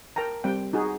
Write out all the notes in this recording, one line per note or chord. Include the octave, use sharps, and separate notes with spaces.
A#4 G5 A5 A#5
G3 C4 G5
D#4 F#4 G#4